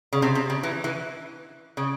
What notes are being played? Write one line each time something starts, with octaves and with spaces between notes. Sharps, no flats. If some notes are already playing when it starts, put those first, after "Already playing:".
C#3
C3
C3
C#3
E3
E3
C#3